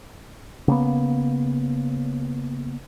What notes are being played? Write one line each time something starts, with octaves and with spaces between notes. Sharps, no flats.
C#3 A#3 B3